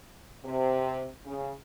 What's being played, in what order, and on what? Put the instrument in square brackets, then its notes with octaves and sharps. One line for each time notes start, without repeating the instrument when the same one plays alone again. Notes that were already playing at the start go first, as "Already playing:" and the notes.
[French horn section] C3
C#3